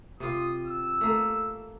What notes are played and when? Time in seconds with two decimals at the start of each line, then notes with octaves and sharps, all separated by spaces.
0.20 C3 F4 D#6
0.65 E6
1.01 A3 A#3